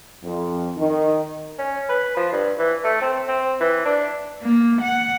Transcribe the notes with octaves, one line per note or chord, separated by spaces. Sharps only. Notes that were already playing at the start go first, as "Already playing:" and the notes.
F2
D#3
C#4
B4
F3
G2
E3
A3
C4
C4
E3
D4
A#3
F#5